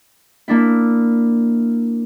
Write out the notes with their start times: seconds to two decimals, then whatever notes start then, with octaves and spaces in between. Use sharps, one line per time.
0.48 A#3 D4 E4